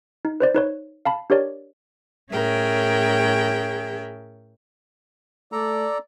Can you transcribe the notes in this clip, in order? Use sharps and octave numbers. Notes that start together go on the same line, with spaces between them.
D#4
B4 C5 D5
D#4 B4 C#5
F5 A5 B5
D4 G4 A#4 C#5 D5
A2 C#4 G#4 A#4 E5 G5
A3 A4 D5 A#5